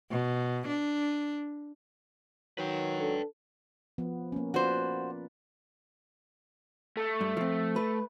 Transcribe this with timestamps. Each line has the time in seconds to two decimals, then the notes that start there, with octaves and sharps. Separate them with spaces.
0.11 B2
0.68 D4
2.58 D#3 F#3 B4 G5
3.00 D4 A4
3.98 F3 B3
4.32 A#3 C#4
4.54 F4 F#4 B4 C5 D5
6.97 A3
7.21 G2
7.37 F3 C4
7.76 B4